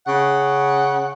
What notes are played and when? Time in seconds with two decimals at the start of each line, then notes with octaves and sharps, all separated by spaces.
0.07 C#3 F#5